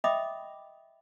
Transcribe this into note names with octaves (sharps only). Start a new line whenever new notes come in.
D#5 E5 G5 B5 D6 D#6